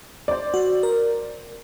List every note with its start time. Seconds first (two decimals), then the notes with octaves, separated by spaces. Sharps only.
0.28 C5 D5
0.54 F#4
0.83 A#4